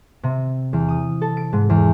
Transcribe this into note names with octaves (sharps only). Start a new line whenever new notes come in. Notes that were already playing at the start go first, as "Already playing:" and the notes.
C3
E2
D#6
A4
D7
G#2
E2